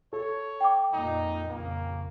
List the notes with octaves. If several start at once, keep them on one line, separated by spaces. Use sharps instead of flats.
A4 C#5
G5 D6
F2 A#2 D#4
A#1 F2 C#3 A#3